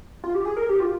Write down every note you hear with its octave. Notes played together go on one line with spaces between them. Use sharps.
F4
G4
G#4
A#4
G4
F4